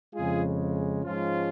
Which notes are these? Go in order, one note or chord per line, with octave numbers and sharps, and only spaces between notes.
F2 C#3 G#3 F4 G#4
G#2 F3 G#3 C#4 F4